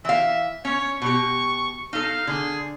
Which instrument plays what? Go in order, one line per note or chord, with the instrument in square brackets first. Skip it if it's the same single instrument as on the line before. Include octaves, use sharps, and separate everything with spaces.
[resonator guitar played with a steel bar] E3 F5 [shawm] E5
[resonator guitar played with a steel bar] C#4 [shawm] C#5
[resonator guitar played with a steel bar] B2 G4 [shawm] C#6
[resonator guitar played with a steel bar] D#4 A4 [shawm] F5
[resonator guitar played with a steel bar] D3 [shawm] G#4